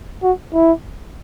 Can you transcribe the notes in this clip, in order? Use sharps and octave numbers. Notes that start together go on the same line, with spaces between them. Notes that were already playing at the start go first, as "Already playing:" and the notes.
F#4
E4